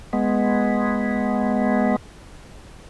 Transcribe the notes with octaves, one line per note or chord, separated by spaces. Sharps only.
G#3 B3